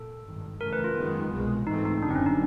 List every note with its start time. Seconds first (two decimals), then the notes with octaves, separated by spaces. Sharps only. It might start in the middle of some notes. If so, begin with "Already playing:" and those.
Already playing: A#2 A4
0.25 G#1 G2 D#3
0.60 F#2 C#3 E3 A3 A#4
0.73 B4
0.84 F4
0.96 F#2 D#3 G#3 B3
1.32 C2 B2 G#3
1.67 G#2 E3 A3 C4 D#4
1.85 D#4
2.03 F#1 F#2 D3 G3 D4
2.10 C4
2.15 C#4
2.26 D#4